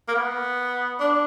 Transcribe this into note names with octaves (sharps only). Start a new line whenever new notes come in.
A#3
B3
D4